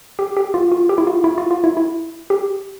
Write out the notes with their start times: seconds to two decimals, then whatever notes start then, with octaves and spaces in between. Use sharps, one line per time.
0.19 G4
0.37 G4
0.54 F4
0.72 F4
0.89 G4
0.98 E4
1.07 F4
1.24 E4
1.38 F4
1.51 F4
1.64 E4
1.77 E4
2.30 G4